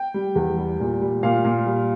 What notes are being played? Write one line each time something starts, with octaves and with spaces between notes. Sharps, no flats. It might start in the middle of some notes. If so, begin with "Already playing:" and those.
Already playing: G5
G3
E2
G3
A#2
G3
A#2 F5
A#2
G3